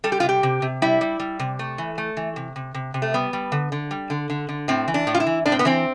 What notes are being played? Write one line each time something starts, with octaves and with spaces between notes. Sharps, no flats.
G3 A4
G4
C3 F4
G4
C3
C3
G3 E4
G3
G3
C3
A3
E3
A3
E3
C3
C3
C3
C3
A3
G3 B3
G3
D3
D3
G3
D3
D3
D3
A2 C4
E3
D4
A2
F4
E4
E3
A2 D4
C4
B3
E3 C4